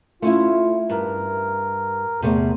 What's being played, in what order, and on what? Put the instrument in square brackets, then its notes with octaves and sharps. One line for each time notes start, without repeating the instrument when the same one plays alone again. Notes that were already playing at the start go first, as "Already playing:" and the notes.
[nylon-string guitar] A3 C#4 E4 [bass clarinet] F4
[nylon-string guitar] G2 [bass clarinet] A#4
[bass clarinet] E2 [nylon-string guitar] C3 A3